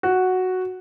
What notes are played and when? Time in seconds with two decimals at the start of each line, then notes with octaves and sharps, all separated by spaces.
0.03 F#4